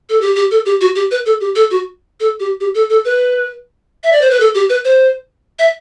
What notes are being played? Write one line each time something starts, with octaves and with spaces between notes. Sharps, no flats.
A4
G4
G4
A4
G4
F#4
G4
B4
A4
G4
A4
F#4
A4
G4
G4
A4
A4
B4
E5
D5
C5
B4
A4
G4
B4
C5
E5